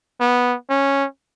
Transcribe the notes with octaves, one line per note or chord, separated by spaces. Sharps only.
B3
C#4